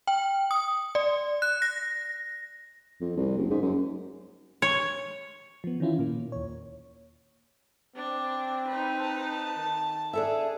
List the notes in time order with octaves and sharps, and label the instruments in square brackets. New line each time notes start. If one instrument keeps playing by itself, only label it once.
[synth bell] G5
D#6
D5
F#6
A#6
[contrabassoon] F2
C2
F#1
G#2
F#2
[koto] C#5
[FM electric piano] F3 B3
D#3 E3 C#4 E4 F4
A#2 A#3
D#2 C#5
[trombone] C4 [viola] D4
[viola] D#4 B4
[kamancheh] A5
[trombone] D#3
[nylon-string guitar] D4 A4 E5 [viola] G#4